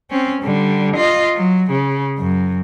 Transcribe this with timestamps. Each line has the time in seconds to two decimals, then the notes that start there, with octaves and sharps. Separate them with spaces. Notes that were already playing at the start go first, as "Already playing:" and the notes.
0.10 C4 C#4
0.42 D3 G3
0.96 F4 D#5
1.36 F#3
1.71 C#3
2.18 F#2